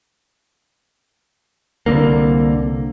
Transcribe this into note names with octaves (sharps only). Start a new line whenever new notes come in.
C2 D3 A#3